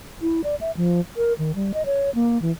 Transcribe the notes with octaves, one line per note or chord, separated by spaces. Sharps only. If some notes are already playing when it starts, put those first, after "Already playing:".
E4
D5
E5
F3
A#4
D#3
G3
D#5
C#5
A#3
E3